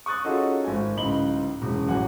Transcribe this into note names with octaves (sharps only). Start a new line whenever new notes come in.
C#6 D#6 F#6 A6
C#4 D#4 F4 F#4 G#4 A4
G#1 G#5
D1 C#2 D#4 B5 F#7 G7
E1 F#2
A1 F#3 F#5 G#5